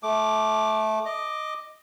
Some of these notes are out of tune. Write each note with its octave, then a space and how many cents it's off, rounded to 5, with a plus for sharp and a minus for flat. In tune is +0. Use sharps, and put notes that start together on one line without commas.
A3 -20 D6 +0
D#5 +0 D6 +10